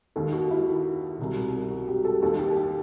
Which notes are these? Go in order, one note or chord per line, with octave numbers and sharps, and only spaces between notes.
D#2 D#3 A4
F#4
E4
C2 B2
F#4
G4
A4
D#2 D#3 A4
G4
G4